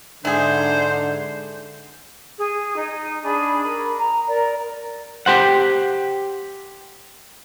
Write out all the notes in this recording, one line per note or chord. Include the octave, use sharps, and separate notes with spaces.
G#2 D3 D4 E4 G#4 C5
G#4
D#4
D4 G#4 G#5 B5
A#4 B5
A#5
A#4 D5
G4 C5 F#5